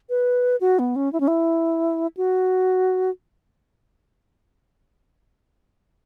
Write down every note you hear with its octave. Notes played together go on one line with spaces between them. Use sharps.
B4
F#4
B3
C#4
E4
C#4
E4
F#4